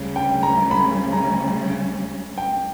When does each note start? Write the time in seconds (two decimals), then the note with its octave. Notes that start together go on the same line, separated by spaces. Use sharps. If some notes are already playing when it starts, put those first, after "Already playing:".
Already playing: D2 C#3 G3 C#4
0.16 G5
0.43 A#5
0.71 B5
1.13 A#5
2.38 G5